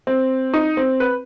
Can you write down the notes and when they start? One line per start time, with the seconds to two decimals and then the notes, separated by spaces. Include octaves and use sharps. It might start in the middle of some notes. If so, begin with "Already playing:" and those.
0.07 C4
0.54 D#4
0.77 C4
1.00 B4